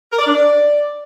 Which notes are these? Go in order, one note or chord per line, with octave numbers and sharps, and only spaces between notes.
A#4
D5
D4
D5